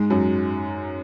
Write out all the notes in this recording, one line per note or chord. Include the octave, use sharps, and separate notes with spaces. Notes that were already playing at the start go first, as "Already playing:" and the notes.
Already playing: G#2 G#3
F#2 F#3